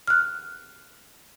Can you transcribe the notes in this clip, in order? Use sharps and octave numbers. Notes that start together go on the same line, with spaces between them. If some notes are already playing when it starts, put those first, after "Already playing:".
F6 F#6